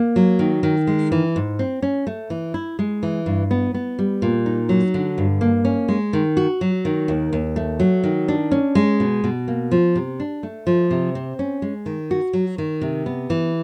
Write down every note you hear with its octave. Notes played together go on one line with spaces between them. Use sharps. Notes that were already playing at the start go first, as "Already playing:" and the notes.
Already playing: A#3
F#3
D#3
D#3
G#3
E3
G#2
C4
C#4
A3
E3
E4
G#3
E3
G2
B3
B3
G3
A#2
D#4
F#3
D3
G2
A#3
C#4
G#3
D#3
F#4
F#3
D#3
D#2
D#2
A3
F#3
D#3
D4
C#4
G#3
B2
B2
A#3
F3
C3
D4
A3
F3
C3
C4
C#4
G#3
D#3
F#4
F#3
D#3
C3
B3
E3